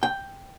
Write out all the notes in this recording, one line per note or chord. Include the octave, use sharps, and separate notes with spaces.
G5